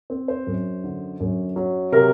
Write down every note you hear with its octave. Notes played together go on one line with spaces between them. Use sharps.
C4
C5
F#2
D3
F#2
F#3
C3 A#4